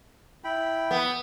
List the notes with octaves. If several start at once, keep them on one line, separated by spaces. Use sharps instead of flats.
E4 G5 B5
B3